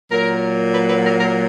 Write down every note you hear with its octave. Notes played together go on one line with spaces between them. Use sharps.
A#2 F#3 A#4
B4
B4
A#4
A#4